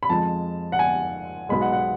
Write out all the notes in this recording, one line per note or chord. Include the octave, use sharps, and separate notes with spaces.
B5
F2 F3 G#3 A5
F#5
G#5
B1 B2 G#3 B5
F#5
F#5